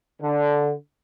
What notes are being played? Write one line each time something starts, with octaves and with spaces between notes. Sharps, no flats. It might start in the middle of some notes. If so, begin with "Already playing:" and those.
D3